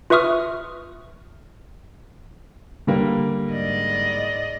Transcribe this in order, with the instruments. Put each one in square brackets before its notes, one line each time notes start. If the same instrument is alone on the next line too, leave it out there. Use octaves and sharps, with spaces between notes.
[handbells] F4 B4 E5 C#6 D#6 F6
[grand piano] D3 G3 A#3
[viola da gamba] G#2 D5 D#5